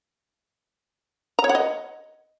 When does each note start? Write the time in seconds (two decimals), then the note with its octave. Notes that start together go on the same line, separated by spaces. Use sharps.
1.39 A#5
1.44 C#5
1.49 F#5
1.55 D#5